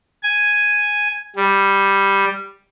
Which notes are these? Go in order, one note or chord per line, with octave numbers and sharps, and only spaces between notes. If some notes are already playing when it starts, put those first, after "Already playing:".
G#5
G3